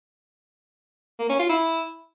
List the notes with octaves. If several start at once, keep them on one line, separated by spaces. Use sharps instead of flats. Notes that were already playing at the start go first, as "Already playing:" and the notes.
A#3
C#4
F4
E4